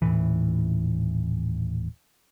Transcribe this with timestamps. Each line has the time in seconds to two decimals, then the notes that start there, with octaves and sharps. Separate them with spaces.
0.02 D#1 C#2 A2 E3